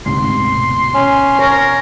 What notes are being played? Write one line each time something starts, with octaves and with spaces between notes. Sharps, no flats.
D2 G#2 C3 C6
B2
C#4
A#4 C#5